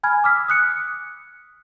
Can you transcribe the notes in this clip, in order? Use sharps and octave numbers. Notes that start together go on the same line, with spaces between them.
G#5 B5 F6 G#6
D6 E6 F6 B6
D#6 F#6 C#7